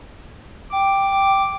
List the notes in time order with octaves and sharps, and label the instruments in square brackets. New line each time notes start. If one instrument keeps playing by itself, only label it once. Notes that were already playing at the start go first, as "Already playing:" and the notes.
[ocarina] G5 [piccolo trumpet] D6